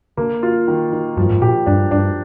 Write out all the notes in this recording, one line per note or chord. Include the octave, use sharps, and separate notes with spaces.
D3 A#3
F4
D#3
D#3
G2 F3
G#2
A#2 G4
G2 D4
G2 D4